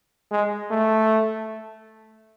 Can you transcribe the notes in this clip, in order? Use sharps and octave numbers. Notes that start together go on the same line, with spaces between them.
G#3
A3